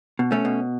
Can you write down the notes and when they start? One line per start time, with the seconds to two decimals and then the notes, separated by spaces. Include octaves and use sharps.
0.19 B2
0.32 A3 C#4
0.45 B2